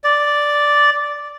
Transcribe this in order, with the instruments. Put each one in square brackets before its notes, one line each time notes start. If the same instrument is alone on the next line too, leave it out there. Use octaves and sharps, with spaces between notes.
[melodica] D5